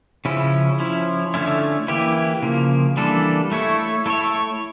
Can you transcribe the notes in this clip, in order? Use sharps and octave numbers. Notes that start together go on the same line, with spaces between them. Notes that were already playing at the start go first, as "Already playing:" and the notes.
C#3 F3 C#4 E4
F3 C#4 E4
D3 A3 C#4 E4
E3 A#3 E4 G4
C#3 F3 A#3
E3 G3 A#3 D4 A4
A3 E4 A4 C#5
A3 E4 A4 C#5